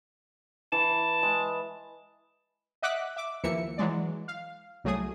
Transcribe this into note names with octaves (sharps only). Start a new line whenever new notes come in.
E3 A5
G#3
D#5 E5 F#5 D6 F#6 B6
E5 D6
D#2 E3 F3 A#3 E5 C#7
E3 F#3 G#3 D5
F5
C2 F#3 A3 G#4 D#6